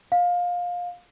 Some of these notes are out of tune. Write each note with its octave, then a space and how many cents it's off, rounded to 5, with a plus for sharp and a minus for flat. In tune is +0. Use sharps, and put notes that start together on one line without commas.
F5 +20